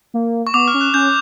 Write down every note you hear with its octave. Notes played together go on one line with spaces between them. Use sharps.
A#3
C#6
B3 D6
F6
C#4
F#6
C#4 G6